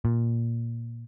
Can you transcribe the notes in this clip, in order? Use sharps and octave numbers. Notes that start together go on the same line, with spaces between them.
A#2